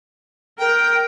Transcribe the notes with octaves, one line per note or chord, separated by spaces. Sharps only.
A#4 G5